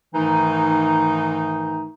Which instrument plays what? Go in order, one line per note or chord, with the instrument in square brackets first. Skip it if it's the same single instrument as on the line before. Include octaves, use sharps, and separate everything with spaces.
[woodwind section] G#2 D#3 E3 A3 D#4